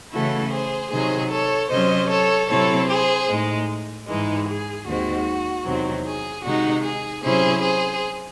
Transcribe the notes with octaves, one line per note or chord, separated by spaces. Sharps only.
C#3 E3 A3 C#4 E4 F#4 A4
G#4 C5
C3 D#3 F#3 G#4 C5
A4 C#5
C3 F#3 C#4 C5 D#5
A4 C#5
C3 F#3 C4 E4 A4 C#5
G#4 C5
A2 G#3 D#4
G#2 E3 G#3 D#4
G#4
D#2 D#3 G#3 C4 F#4
E2 C3 D#3 F#3 C4
G#4
C3 D#3 G#3 D#4 F#4
G#4
C3 F#3 C#4 E4 G#4 C5
G#4 C5